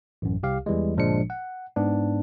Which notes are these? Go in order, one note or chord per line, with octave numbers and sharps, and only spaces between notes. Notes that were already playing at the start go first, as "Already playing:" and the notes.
A1 F#2
C2 G4 F5
E2 E3 G3 G#3
G1 A#2 F3 G#3 D4 C#7
F#5
G#2 B3 D4